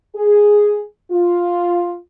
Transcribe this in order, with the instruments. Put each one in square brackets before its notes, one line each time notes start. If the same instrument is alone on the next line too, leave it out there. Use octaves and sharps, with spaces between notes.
[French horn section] G#4
F4